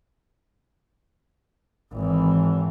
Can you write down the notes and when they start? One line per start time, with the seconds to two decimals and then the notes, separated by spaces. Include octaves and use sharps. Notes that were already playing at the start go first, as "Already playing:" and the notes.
1.93 G#1 E3